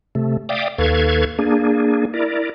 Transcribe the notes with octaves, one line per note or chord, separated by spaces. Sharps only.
C3 A3
D5 E5 F5 G5 D6 D#6
D#2 A4 B4 F5 C#6 G#6
A#3 D4 G#4
E4 A#4 D5